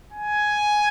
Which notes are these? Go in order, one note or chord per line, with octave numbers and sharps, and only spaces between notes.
G#5